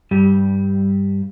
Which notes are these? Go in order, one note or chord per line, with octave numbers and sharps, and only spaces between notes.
G2 G3